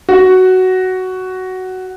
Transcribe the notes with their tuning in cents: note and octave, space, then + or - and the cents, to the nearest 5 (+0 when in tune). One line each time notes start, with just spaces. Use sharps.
F#4 +10